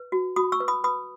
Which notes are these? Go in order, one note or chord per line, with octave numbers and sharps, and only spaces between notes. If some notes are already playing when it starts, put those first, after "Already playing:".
Already playing: B4
F#4
F#4 B5 D#6
C#6 E6
B4
B5 D#6
B4 B5 D#6